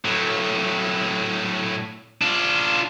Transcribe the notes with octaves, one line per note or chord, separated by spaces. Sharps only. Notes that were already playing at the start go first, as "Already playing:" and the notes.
A2 F#3
D4 F4